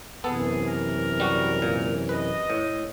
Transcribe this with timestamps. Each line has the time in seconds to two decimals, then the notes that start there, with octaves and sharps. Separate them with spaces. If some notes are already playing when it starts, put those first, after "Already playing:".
0.24 F#2 C3 E3 B3 G#4 A4
0.68 A#4
1.20 G3 F#4
1.62 A#2
2.09 B4 D#5
2.50 A2